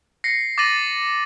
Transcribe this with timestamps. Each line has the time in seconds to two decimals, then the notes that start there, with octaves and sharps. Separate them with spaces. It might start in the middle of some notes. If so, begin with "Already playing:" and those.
0.24 A#6 C7 C#7
0.58 D6 A6 A#6 D#7 F#7